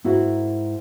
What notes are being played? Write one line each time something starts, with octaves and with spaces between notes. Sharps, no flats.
G#2 E4 F#4 A#4